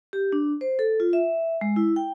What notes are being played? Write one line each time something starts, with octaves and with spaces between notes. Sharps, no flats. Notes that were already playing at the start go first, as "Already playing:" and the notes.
G4
D4
C5
A4
F4
E5
G#3
E4
G5